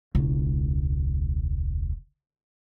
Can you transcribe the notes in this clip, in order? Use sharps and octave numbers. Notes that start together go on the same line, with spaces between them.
E1 C#2